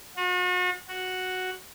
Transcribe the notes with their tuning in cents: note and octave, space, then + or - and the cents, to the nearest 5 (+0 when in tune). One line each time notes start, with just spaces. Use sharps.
F#4 -40
F#4 +0